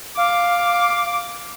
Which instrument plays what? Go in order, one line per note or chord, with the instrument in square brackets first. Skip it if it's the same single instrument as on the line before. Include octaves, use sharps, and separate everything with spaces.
[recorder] F5 [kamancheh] D6